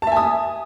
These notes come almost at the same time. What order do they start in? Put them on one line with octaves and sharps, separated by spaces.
A5 E5 G#5 D#6